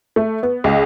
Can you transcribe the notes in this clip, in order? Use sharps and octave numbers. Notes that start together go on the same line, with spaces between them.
A3
B3
C#2